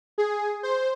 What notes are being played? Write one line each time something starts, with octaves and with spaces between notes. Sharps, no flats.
G#4
C5